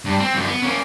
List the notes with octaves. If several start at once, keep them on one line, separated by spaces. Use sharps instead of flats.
G2
C4
F#2 D3
B3
A#3 C#4